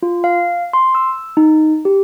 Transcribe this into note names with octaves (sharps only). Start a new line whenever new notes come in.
F4
F5
C6
E6
D#4
G4